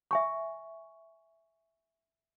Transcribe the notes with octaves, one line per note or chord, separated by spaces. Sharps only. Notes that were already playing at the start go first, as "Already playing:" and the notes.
E5 G#5 C#6